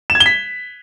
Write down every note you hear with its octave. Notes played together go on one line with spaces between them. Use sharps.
E7
G#6
G7
B6